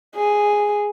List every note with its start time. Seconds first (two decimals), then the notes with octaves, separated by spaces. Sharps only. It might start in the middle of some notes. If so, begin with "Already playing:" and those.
0.15 G#4